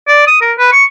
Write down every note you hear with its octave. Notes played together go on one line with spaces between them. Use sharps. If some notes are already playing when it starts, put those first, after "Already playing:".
D5
D#6
A#4
B4
C#6